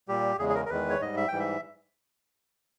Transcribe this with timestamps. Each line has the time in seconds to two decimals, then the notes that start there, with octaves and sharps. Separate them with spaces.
0.08 A#2 G3 G4
0.39 E2 C#3 G#3 G#4
0.49 G#4
0.55 A#4
0.65 A#4
0.70 E2 D#3 G#3 B4
0.90 C#5
1.01 G#2 G3 D#5
1.17 E5
1.28 G#2 E3 G3 G5
1.39 E5